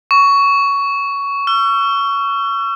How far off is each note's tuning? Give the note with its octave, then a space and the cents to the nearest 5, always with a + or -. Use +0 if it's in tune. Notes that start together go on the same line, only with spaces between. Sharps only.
C#6 +15
E6 +45